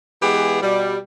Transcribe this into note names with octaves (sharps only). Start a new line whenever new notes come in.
E3 G#3 B3 G4 G#4
B2 G3